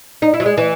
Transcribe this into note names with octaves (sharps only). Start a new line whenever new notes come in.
D#4
E4
F#3
G#3
E3